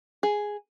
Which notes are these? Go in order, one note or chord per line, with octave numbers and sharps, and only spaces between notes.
G#4